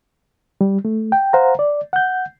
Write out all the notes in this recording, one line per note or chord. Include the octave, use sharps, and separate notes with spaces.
G3
A3
G5
C5 F5 F#5 A#5
D5
F#5 G6